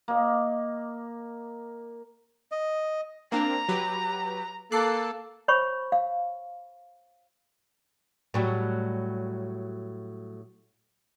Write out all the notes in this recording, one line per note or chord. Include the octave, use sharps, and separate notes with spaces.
A#3 D#5
D#5
A#3 C4 D4 A#5
F#3 G4 B4
A#3 A4 A5 D6 F#6 C7
C5 C#5 B5 C#6
F5
A2 F#3 G3